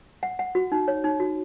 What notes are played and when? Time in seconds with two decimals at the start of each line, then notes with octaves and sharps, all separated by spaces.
0.23 F#5
0.39 F#5
0.55 F#4
0.72 D#4
0.88 C#5
1.04 D#4
1.20 F#4